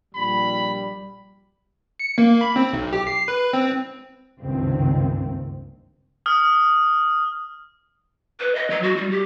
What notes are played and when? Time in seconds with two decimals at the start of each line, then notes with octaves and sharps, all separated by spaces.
0.15 A#1 G3 B5
1.99 C#7
2.18 A#3
2.41 B5
2.56 C4
2.73 B1
2.93 G4
3.07 C7
3.28 B4
3.53 C4
4.40 F#1 C#2 G2 C3 D#3 C4
6.26 D#6 F6
8.40 B4
8.55 D#5
8.70 F#3
8.83 F#4
8.97 G3
9.11 G4